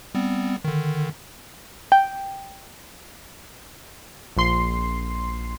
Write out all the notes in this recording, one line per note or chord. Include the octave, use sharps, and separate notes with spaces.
G3 B3 C4
D3 D#3
G5
A#1 C6 C7